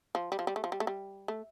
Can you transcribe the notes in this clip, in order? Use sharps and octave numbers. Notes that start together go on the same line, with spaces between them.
F3
G3
F3
G3
A3
F3
G3
A3
G3
A3